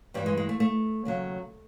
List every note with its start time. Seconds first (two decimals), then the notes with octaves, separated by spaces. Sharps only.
0.14 G2 E3 G3
0.26 G#3
0.37 G#3
0.49 A3
0.60 A3
1.05 D#2 C#3 F#3